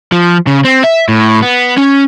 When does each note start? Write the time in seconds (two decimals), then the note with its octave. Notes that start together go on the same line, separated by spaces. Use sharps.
0.12 F3
0.47 C#3
0.64 C4
0.84 E5
1.09 A2
1.42 B3
1.77 C#4